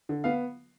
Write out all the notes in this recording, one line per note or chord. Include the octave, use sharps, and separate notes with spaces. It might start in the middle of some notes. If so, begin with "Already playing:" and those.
D3
B3 F5